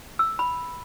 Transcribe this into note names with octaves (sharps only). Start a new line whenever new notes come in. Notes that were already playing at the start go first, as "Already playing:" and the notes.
E6
B5